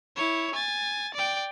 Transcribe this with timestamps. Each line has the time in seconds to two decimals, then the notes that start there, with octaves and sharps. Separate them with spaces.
0.16 E4 C#5
0.54 G#5 A6
1.14 D5 G5